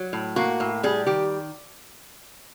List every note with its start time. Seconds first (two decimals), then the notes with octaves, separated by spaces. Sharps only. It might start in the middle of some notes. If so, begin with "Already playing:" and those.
Already playing: F#3
0.13 A2
0.36 A#3 F#4
0.60 A2
0.83 G3 G#4
1.06 D#3 G4